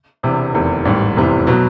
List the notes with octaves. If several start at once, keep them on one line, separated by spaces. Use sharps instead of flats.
E1 E2 C3
F1 E2 C3 D#3
A1 G#2 D#3 G3
F1 E2 C3 E3
B2 F#3 B3